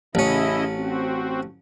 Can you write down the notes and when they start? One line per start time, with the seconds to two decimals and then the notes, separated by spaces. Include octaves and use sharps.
0.15 A1 C#3 C#4 E4 D#5
0.74 C4 F#4